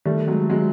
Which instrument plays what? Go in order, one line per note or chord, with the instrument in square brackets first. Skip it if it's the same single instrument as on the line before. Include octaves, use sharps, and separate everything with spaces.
[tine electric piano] D#3 [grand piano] G3 A3
[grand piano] F#3 G#3
F#3 G#3